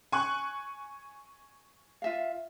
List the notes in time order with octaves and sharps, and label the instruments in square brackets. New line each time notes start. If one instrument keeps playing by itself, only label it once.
[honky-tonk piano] G#5 C#6 F#6
[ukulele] F4 E5 F5